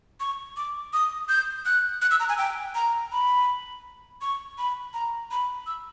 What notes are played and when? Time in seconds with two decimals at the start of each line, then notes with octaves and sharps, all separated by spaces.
0.20 C#6
0.57 D6
0.93 D#6
1.29 G6
1.66 F#6
2.01 F#6
2.11 E6
2.20 A#5
2.29 G#5
2.38 G5
2.75 A#5
3.12 B5
4.21 C#6
4.58 B5
4.93 A#5
5.31 B5
5.66 E6